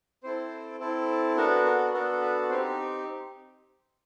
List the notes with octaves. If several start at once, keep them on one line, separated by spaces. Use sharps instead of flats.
C4 E4 A4 C5
C4 E4 A4
B3 D4 F#4 A4 A#4
A#4
B3 D4 F#4 A4 A#4
B4
C4 D#4 G4 C5